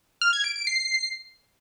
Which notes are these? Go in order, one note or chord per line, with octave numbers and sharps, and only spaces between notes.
F6
G#6
D7
D7
C7